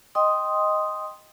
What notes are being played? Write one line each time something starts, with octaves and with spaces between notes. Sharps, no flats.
D#5 G5 C6 D#6